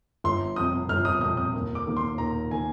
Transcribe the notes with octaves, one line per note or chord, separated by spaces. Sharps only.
G1 C6
F2 C3 D#6
G1 F6
D#6
F2 C3 D#6
D#6
D#2
D6
D#3 A#3
C6
D#2 A#5
D#3 A#3 G#5